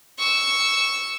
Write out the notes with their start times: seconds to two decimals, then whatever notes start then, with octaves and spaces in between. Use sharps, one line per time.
0.19 C#6 E6